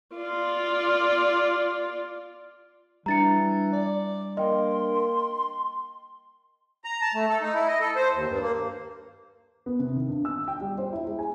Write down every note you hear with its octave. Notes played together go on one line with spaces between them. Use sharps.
F4 D5
E3 G3 D4 A#5 A6 C#7
D5
A#3 D#5 G5 C6
A#5
A5
A3
A4
D#4
E4
D#5
A4
C5
D#2
G2
A#3
B3
C3
D#3
G2
E6
G5
G3
C5
E4
G#3
G#5